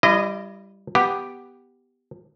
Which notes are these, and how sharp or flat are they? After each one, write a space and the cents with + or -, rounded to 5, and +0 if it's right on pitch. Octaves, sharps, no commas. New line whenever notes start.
G3 +0 E4 +35 D#5 -15
B3 +0 G4 +0